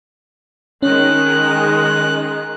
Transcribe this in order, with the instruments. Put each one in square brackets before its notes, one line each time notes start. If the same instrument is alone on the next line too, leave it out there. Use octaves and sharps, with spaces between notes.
[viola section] D#3 G#3 [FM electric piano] C#4 [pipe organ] F#6